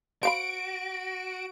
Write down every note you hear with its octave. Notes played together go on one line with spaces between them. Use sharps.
F#4 C5 F5 B5 D7